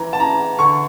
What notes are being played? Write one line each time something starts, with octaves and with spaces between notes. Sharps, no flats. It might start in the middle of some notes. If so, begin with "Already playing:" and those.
Already playing: E3 A#5
A5
E3 A#5
D3 C#6